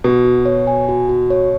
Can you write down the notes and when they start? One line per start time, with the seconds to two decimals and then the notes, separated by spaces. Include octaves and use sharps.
0.04 B2 F#4
0.25 F#4
0.45 C#5
0.67 G#5
0.89 F#4
1.09 F#4
1.30 C#5